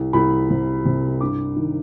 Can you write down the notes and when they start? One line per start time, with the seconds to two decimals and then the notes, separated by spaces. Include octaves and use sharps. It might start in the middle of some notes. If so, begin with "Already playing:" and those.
Already playing: C2
0.13 C2 B5
0.50 C3
0.85 C3
1.21 G2 D6
1.56 D#3